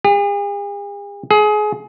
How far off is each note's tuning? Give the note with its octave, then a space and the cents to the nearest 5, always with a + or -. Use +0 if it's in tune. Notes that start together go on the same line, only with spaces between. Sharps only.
G#4 -45
G#4 +25